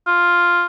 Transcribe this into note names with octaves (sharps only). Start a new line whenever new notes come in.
F4